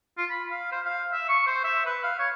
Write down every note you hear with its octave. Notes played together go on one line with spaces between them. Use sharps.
F4
B5
F5
C5
F5
E5
C#6
C5
E5
B4
F5
C#5